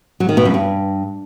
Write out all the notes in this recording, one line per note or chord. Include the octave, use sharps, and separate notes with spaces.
F#3
D#3
B2
F#2
G2